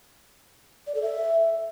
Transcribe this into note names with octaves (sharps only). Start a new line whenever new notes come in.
D5
A4
E5